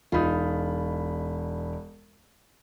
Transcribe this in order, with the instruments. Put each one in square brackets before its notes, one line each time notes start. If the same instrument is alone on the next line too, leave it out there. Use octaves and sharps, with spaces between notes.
[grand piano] E1 B5 [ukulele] D#4 F4